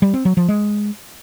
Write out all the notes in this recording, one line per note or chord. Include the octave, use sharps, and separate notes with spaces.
G3
C4
F#3
F3
G#3